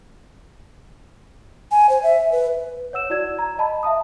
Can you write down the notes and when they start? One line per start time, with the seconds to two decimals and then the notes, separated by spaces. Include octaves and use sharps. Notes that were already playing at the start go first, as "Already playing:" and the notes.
1.71 G#5
1.89 C5
2.03 E5
2.32 B4
2.93 C#5 F#5 E6 E7
3.10 E4 F#4 D5 E6 G#6 E7
3.39 A#5
3.58 D#5 A5 B5
3.83 E5 F5 A5 D#6